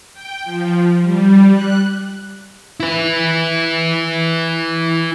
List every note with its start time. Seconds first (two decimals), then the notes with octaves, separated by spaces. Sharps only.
0.14 G5
0.44 F3
1.01 G3
1.52 F#6
2.80 E4 B4